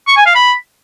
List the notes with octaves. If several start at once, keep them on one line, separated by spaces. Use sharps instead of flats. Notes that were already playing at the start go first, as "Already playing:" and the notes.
C#6
G#5
F5
B5